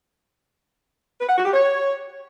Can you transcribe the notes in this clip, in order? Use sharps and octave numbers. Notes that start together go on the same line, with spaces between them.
B4
F#5
F#4
G4
C#5